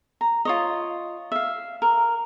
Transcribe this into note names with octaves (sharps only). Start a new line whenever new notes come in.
A#5
F4 C#5 D#5
E5 F5
A#4